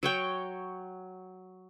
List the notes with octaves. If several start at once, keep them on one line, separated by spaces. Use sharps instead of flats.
F#3 C#5 G5